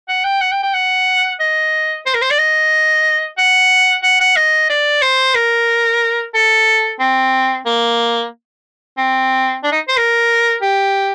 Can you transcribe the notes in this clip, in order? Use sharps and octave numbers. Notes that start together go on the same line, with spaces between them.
F#5
G5
F#5
G5
G5
F#5
D#5
C5
A#4
C5
D5
D#5
F#5
F#5
F#5
D#5
D5
C5
A#4
A4
C4
A#3
C4
D4
D#4
C5
A#4
G4